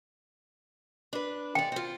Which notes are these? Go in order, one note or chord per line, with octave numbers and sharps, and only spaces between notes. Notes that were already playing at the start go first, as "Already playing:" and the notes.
D4 B4
G#3 D5 G5
C4 F4